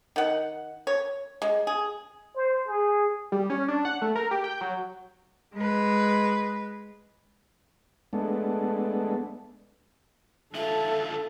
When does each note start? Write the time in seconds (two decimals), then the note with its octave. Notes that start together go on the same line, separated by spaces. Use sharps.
0.16 D#3 F#5
0.87 C#5
1.42 G#3
1.67 G#4
2.36 C5
2.67 G#4
3.32 G3
3.50 C#4
3.68 D4
3.85 F#5
4.02 A3
4.15 A#4
4.31 G4
4.44 G5
4.61 F#3
5.55 G#3 B4
8.13 G#3 A3 B3 D4
10.55 D3 F4 A4 E5